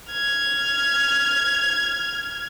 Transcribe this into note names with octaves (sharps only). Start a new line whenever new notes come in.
F6 G#6